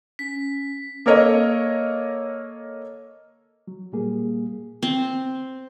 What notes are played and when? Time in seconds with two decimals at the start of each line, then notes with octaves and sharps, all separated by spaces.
0.19 C#4 B6
1.06 A#3 A4 A#4 C#5 D#5
3.68 F#3
3.93 A#2 G3 A#3 G#4
4.83 C4